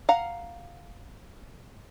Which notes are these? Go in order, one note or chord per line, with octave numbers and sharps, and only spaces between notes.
F5 F#5 A#5